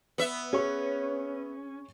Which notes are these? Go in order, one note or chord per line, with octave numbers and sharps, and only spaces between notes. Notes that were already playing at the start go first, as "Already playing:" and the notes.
B3 E5
C#4 G#4 C#5 C#6